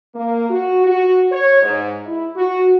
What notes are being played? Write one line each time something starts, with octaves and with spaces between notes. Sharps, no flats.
A#3
F#4
F#4
C#5
G#2
E4
F#4